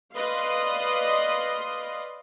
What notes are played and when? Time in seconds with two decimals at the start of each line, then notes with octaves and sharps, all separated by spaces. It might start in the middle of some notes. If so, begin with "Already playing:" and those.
0.15 B4 D5 D#5 F5 C6